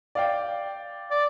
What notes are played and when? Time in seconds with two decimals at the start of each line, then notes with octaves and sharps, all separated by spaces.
0.15 D5 F5 G5
1.11 D5